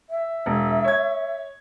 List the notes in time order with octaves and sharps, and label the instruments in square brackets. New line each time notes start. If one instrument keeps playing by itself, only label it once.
[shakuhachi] E5
[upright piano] E1
C#5 G#6